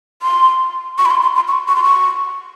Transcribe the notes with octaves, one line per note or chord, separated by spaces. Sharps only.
C6
C#6
B5
C6
C6
C6
C#6
C#6
C6
C#6